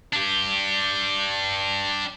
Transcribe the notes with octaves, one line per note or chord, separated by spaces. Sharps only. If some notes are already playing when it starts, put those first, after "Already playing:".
D4 G4